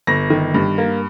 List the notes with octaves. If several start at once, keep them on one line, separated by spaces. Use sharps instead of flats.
G1 A#6
D#3
G2
A#3